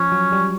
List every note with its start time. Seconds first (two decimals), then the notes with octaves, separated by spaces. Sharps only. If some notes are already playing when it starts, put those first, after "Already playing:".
Already playing: F3 C#4
0.12 F#3
0.32 G3